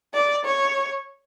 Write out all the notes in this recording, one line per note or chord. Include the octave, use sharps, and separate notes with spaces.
D5
C#5